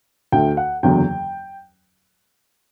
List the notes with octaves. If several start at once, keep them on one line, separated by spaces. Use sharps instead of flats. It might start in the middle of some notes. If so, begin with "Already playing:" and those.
D2 D3 A3 G5
F#5
F#1 E2 D3 F#3 G5